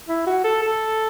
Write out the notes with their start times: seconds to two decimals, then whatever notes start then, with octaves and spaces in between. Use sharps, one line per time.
0.08 E4
0.27 F#4
0.44 A4
0.62 A4